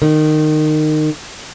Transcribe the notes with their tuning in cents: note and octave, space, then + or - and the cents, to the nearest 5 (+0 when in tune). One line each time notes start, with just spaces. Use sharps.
D#3 -20